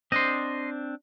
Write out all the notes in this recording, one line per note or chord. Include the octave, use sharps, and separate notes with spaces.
C4 D4 C5 D#5